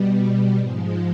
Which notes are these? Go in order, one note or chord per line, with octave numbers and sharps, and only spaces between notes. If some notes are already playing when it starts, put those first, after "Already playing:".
Already playing: B2 G3
G#2 F3 G#3 G#4